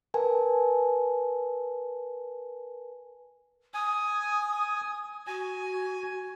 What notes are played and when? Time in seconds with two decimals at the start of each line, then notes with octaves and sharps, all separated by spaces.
0.14 A#4 B4 G#5 A5
3.74 G#5 D#6
5.27 F#4 G#5